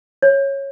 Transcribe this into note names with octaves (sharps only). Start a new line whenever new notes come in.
C#5